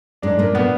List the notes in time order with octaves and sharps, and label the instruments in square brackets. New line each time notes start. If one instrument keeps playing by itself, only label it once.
[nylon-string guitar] G#2 G#3 [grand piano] D4
[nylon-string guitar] A#2 A#3
[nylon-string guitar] A#2 A#3 [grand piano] B3